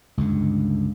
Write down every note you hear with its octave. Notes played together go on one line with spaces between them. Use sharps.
C#2 G2 D3